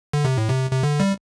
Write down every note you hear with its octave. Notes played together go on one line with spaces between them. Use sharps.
D3
C3
A2
C3
C3
D3
G3